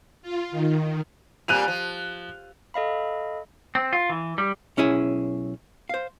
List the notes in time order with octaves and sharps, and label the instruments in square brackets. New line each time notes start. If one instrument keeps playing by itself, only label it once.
[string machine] F4
D#3
[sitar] A#2 G3 C4 [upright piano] F#6 D#7 F7
[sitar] F3
[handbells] A4 D#5 F5 B5
[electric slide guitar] C4
F4
E3
G3
[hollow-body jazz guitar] B1 C#4 E4 G#4
C5 F5